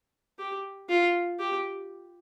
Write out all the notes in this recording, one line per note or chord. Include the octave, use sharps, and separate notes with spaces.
G4
F4
G4